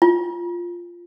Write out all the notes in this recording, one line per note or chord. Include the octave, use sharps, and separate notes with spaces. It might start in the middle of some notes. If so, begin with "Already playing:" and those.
F4